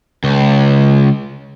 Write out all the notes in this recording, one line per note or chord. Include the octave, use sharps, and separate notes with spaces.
C#2